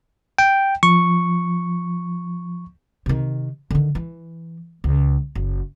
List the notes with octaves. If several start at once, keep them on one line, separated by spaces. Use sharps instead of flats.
G5
F3 C#6
C3 D#3
D3 D#3
E3
C#2
F#1